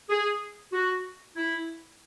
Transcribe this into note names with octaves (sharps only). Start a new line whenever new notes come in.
G#4
F#4
E4